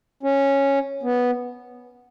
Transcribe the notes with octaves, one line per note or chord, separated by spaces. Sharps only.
C#4
B3